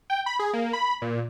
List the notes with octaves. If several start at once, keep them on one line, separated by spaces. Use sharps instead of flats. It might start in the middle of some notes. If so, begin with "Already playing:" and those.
G5
B5
G#4
A#3
B5
A#2